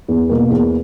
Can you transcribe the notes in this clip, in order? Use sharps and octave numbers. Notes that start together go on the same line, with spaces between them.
E2
B2 A#3
E2